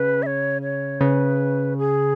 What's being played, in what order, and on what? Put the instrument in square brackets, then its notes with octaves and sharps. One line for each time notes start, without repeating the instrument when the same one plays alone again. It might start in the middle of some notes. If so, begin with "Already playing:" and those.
Already playing: [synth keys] C#3 [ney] B4
[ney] E5
C#5
C#5
[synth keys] C#3 [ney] B4
[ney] G#4